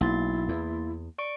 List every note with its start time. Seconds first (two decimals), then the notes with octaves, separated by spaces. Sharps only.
0.01 B1 A#3 E4 C6 A6
0.49 E2
1.18 D5 C#6 D7